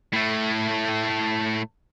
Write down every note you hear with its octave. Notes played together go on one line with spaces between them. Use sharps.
A2 A3